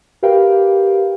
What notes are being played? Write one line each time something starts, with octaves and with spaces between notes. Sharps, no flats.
G4 A#4 B4 F5 G5